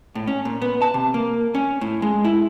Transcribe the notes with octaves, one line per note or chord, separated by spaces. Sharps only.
A2
C#4
A#2
B3
A5
C3
A#3
C#4
A2
G#3
E4